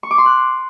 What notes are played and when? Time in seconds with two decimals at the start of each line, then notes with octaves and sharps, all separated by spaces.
0.03 C#6
0.11 D6
0.18 C6
0.26 F#6